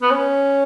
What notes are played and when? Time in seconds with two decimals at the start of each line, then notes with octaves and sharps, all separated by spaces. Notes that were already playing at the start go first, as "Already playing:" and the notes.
0.02 B3
0.10 C#4